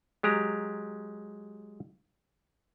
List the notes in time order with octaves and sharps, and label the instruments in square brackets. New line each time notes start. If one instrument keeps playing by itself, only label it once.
[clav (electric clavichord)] F#3 G#3 G4 A#5